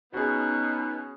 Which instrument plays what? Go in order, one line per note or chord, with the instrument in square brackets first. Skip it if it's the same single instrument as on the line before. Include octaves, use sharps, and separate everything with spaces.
[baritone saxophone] B2 [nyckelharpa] B3 C#4 [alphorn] D#4 [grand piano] F#4 G#4